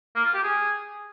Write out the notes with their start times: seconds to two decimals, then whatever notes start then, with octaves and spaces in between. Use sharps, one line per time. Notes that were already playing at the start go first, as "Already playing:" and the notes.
0.15 A#3
0.25 F4
0.34 G4
0.43 G#4